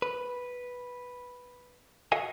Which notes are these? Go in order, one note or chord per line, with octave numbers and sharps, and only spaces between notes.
B4
F#4 A4 D#5 F5 F#5 G#5